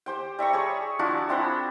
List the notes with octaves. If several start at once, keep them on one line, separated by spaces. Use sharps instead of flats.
G4 C5 G5
G3 E5 A#5 C#6
G#4 C#5
F3 D4 E4 F#4
C4 E4 C5 B5